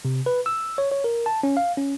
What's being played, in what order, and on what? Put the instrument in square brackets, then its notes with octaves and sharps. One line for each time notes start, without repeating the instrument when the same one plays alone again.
[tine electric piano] C3
B4
E6
C#5
C#5
A#4
A5
C#4
F5
C#4